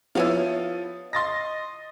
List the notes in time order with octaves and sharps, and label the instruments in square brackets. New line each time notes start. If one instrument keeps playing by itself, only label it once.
[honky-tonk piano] F3 B3 [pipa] E4 C#5 F5
[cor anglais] D#5 [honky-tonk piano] C6 A6 A#6